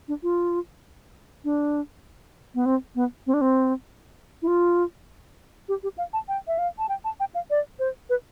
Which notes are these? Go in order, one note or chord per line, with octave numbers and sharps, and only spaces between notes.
D4
F4
D4
B3
C4
B3
C4
D4
C4
E4
F4
G4
G4
F5
A5
G5
E5
F5
A5
G5
A5
G5
F5
D5
C5
B4